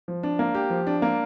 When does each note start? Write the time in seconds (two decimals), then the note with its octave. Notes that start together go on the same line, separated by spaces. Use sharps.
0.08 F3
0.23 D4
0.39 A#3
0.55 G4
0.70 F3
0.87 D4
1.02 A#3